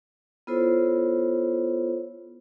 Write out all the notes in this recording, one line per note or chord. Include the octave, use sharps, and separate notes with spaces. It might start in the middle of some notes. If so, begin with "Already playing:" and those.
B3 E4 F4 A4 C5 C#5